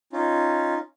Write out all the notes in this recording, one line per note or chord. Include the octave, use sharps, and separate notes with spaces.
C#4 D#4 F4